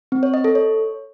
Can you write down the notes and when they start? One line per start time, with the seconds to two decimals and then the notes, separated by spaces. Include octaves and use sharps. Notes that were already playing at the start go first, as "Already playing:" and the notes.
0.12 C4
0.23 C#5
0.34 D#5
0.44 A4
0.55 C#5